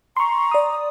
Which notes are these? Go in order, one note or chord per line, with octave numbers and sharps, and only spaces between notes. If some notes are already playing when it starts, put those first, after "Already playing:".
A#5 C6 C#6
D5 D#6